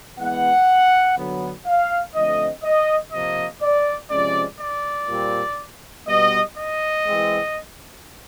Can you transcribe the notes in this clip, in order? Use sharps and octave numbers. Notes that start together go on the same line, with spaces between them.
E3 G#3 B3 F#5
D3 F#3 B3
F5
D3 F3 A3 C4 D#5
D#5
C3 F3 A#3 D#5
D5
C3 F3 G#3 C#4 D5
D5
A#2 G3 C4
B2 G3 B3 D#5
D#5
E3 G#3 C4